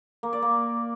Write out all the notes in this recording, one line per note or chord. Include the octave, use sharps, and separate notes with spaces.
A#3
D5
A#3